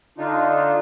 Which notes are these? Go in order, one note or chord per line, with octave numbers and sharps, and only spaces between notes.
D3 D4 D#4 F4